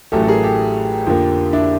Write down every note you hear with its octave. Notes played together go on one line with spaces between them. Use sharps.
A1 A2 F#3 A3 G4 A4
A4
G#4 A#4
G4 A4
F2 D3 F3 A#3
D4 E4